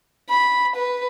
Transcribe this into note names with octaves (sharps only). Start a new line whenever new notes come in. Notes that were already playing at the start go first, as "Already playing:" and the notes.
B5
B4